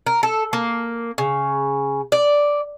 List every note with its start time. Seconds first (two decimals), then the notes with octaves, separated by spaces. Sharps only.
0.06 A#4
0.23 A4
0.53 A#3
1.18 C#3
2.12 D5